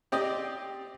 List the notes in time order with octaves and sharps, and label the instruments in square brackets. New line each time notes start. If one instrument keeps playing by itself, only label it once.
[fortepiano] C4 G4 D5 D#5